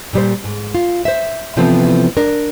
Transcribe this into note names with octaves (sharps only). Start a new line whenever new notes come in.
A#2 G3 C5
G#2
F4
C5 E5
C3 E3 F3 A3 B3 C4
D4 A#4